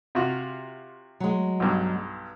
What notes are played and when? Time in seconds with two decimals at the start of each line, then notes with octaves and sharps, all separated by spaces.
0.15 C3 F4 F#4
1.20 F#3 G#3
1.60 B1 G2